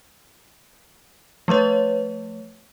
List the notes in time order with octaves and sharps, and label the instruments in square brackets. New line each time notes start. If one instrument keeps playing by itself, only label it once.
[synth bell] F3 A3 B4 C#5